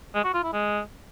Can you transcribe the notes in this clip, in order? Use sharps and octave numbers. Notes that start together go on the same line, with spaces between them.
G#3
F#4
F4
E4
G#3